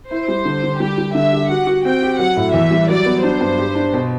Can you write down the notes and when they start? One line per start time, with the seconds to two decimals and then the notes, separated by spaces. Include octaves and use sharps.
0.11 E4 C5
0.28 G3
0.45 D3
0.64 D3
0.80 G3 G4
0.98 G3
1.15 D3 E5
1.33 G4
1.49 F#4 F#5
1.67 F#4
1.85 C4 G5
2.02 G4
2.19 F#3 F#5
2.36 A2
2.54 E2 E5
2.71 G3
2.89 F#3 D5
3.06 B3
3.24 D4 C5
3.41 G2
3.58 G4
3.75 D4
3.94 B2